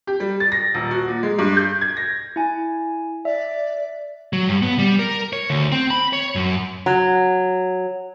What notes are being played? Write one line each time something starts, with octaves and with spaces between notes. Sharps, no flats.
G4
G3
A6
A#6
D#1
F#4
A#2
G#3
G2
G6
G#6
A#6
E4 G#5
D5 E5
F#3
G2
B3
G3
A#4
C#5
D2
C4
B5
C#5
F#2
F#3